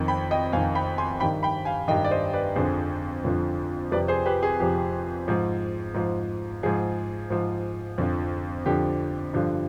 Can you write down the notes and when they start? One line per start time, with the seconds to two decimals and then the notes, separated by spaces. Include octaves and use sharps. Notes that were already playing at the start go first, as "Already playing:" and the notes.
Already playing: F2 D#3
0.08 G5 B5
0.31 D#5 G5
0.52 F2 D#3 F5 G#5
0.75 G5 B5
0.98 G#5 C6
1.20 G2 G5 B5
1.23 D#3
1.43 G5 B5
1.65 F5 G#5
1.88 G2 D#3 D#5 G5
2.05 D5
2.11 C5 D#5
2.33 B4 D5
2.56 F2 D3 F3 G#4 C5
3.25 F2 D3 F3
3.91 F2 C3 F3 B4 D5
4.08 G#4 C5
4.26 G4 B4
4.43 G#4
4.60 F2 C3 F3 G4
5.28 G#2 F3
5.94 G#2 F3
6.63 G#2 F3 G#4
7.30 G#2 F3
7.98 F2 D3 F3
8.66 F2 D3 F3 G4
9.34 G2 D3 F3